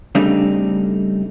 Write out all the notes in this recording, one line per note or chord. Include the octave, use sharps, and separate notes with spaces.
C#3 G3 A3 C4 D4 D#4